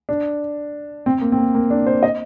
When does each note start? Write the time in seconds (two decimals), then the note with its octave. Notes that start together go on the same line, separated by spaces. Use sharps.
0.09 D4
1.06 C4
1.21 A#3
1.32 C4
1.38 A#3
1.54 A#3
1.70 D4
1.86 C5
2.03 D#5